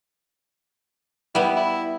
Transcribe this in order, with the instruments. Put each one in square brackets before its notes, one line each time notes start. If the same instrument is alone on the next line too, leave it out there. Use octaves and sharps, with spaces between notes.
[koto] G3 B3 [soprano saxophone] E4
[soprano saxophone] E4